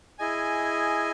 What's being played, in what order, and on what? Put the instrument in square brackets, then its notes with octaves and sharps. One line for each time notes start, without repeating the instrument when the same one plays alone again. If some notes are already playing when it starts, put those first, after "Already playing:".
[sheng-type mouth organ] E4 G#4 D#5 G#5